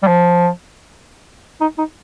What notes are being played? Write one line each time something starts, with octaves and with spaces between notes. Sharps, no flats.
G3
F3
D#4
D#4